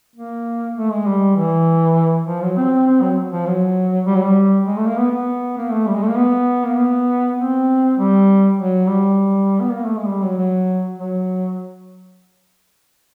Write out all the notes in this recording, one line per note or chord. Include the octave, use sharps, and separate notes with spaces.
A#3
A3
G#3
G3
E3
F3
F#3
C4
C4
F#3
F3
F#3
G3
F#3
G3
G#3
A3
A#3
B3
B3
A#3
A3
G3
G#3
A3
A#3
B3
A#3
B3
C4
G3
F#3
G3
B3
A#3
A3
G#3
G3
F#3
F#3
F#3